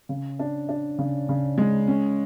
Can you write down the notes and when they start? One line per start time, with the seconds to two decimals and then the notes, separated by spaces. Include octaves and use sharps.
0.09 C#3
0.39 D4
0.69 D4
0.99 C#3
1.29 C#3
1.58 G#3
1.88 C#4